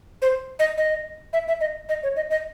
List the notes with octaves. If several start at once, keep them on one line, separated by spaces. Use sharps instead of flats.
C5
D#5
D#5
E5
E5
D#5
D#5
C#5
D#5
D#5